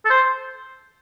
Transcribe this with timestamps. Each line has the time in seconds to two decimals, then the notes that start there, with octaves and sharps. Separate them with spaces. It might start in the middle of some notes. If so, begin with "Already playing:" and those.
0.05 A4
0.10 C5